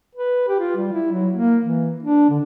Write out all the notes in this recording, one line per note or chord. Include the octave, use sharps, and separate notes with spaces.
B4
G4
F4
G3
E4
F#3
A#3
E3
D4
D3